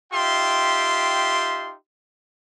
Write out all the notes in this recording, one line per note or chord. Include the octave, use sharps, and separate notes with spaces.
D#4 F4 G4 E5 G5 C6